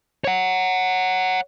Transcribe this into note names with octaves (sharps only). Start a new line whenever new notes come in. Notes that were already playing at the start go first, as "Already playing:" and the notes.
C#5 F#5